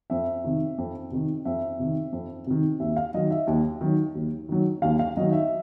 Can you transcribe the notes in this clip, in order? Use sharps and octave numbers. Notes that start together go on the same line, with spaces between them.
F2 E5
C3 D#3
F2
C3 D#3
F2 E5
C3 D#3
F2
C3 D#3
D#2 E5
F5
D#3 F#3 D#5
E5
D#2
D#3 F#3
D#2
D#3 F#3
D#2 F5
F5
D#3 F#3 D#5
E5